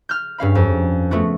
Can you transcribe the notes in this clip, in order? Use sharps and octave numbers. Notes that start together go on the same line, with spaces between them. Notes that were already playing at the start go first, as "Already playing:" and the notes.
F6 G6
G2 C#4 F5 B5
F2
A3 B3 F4 F#4